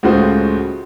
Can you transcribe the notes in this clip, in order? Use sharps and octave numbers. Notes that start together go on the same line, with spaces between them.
C#2 A2 F4 F#4 C5 D#6